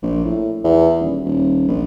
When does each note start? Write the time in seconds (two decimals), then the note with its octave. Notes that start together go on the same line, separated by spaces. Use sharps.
0.02 A#1
0.24 A2
0.64 E2
1.00 D#1
1.25 D#1
1.68 A#1